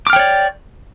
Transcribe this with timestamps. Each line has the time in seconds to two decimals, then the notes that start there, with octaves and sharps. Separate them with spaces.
0.07 D6
0.10 F6
0.13 G5
0.16 C#5
0.19 D5